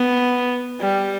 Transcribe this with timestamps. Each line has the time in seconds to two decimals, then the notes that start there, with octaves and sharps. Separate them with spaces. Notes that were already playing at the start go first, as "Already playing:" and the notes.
Already playing: B3
0.80 G3